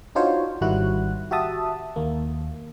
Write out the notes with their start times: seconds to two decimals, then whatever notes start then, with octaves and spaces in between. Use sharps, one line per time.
0.15 D4 D#4 F4 F#4 C5 C#5
0.61 G#1 D#3 G3 E4 F#4 F#6
1.31 F#4 G4 E5 A5 D#6
1.96 D#2 A#3